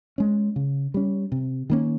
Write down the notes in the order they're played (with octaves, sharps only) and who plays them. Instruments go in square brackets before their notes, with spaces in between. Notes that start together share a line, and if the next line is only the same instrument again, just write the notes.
[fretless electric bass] G#3 C#4
C#3
G3 C#4
C3
D#3 A#3 C#4